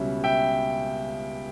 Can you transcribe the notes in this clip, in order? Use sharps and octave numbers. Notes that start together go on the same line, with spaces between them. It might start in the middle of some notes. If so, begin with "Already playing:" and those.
Already playing: C#2 B2 G3 C#4 E5
E5 G5